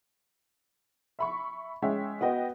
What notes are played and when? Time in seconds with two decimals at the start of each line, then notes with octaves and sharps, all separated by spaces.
1.19 E5 B5 C#6
1.82 G#3 C#4 C#5 E5 G5
2.21 B3 F#4 D#5 G5